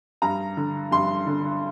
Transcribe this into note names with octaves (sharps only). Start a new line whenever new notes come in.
G2 A#5
D3
G2 C6
D3